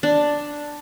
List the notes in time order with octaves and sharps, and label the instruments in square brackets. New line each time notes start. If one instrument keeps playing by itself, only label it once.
[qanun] D4